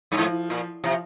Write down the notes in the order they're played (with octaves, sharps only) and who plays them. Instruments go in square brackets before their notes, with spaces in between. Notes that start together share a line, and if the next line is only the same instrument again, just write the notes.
[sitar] G2
[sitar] G#2 [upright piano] F3
[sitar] A#2
[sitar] C3 [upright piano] F3